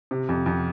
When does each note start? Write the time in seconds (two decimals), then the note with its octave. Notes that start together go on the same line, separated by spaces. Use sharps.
0.11 C3
0.29 F2
0.46 F2